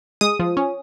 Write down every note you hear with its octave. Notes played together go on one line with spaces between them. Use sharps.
G#3 D#6
F3
C#4